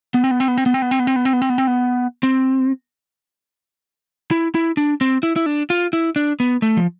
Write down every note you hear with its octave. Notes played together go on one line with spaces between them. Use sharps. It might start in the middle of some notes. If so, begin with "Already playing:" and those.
B3
C4
B3
C4
B3
C4
B3
C4
B3
C4
B3
C4
B3
C4
B3
C4
B3
C4
B3
C4
E4
E4
D4
C4
E4
E4
D4
F4
E4
D4
B3
A3
F3